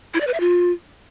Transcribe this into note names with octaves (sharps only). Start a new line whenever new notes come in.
E4
D5
B4
E5
F4